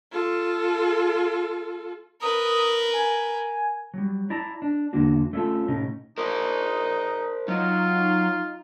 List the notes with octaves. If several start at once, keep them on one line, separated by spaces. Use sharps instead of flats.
F4 A4
A#4 B4 D#6
G#5
F#3 G3
E4 D5 A5 A#5
D4
E2 D3 A#3 D4 F#4
A3 C#4 D4 E4 F4 A4
A2 C3 C#4 D#4
D#4 A#4 C5
F#3 D#4 F4